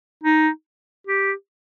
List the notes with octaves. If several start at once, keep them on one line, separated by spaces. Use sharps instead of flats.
D#4
G4